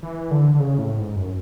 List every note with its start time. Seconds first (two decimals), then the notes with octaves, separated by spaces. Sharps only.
0.03 E3
0.31 D3
0.55 D3
0.60 C#3
0.78 A2
0.98 G#2
1.16 F#2